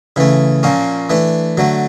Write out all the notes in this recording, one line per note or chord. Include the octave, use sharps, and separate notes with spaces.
C#3 E3 A3
A#2 F3 A#3 C#4
E3 A3 D4
D3 F#3 A3